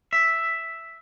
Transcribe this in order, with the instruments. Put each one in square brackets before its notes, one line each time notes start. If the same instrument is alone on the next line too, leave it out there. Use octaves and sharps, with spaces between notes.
[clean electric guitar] E5